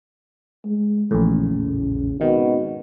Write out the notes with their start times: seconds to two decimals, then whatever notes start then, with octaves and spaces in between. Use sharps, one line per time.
0.66 G#3
1.11 A#1 E2 A2 C#3
2.21 G#1 B2 D#3